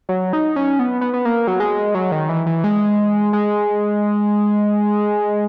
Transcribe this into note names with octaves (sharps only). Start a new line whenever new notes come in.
F#3
D#4
C#4
B3
B3
B3
A#3
F#3
G#3
F#3
D#3
E3
E3
G#3
G#3